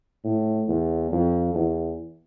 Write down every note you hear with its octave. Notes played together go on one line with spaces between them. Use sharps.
A2
E2
F2
E2